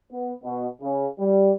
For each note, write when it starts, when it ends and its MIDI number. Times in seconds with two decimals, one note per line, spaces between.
0.12 0.33 59
0.44 0.67 47
0.82 1.07 49
1.19 1.52 55